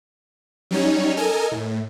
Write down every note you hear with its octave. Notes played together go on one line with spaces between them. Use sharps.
F#3 G3 C#4 D#4 C#5
A4 A#4 D#5 G#5
A2